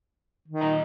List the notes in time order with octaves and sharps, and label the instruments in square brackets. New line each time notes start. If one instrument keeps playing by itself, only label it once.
[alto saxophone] D#3
[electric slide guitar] A#2 D#5 A#5